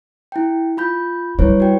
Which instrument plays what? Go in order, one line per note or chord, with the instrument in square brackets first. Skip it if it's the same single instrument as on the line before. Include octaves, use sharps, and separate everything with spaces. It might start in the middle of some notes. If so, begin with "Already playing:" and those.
[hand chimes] E4 G5
F4 B5 G6
[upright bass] G3 [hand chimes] E4 B4 C#5
[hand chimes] F#4 G5